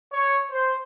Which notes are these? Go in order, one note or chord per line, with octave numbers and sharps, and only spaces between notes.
C#5
C5